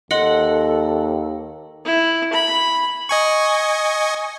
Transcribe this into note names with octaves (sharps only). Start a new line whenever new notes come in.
D#2 A4 D#5 F#5 C6
E4
B5
D#5 G#5 C#6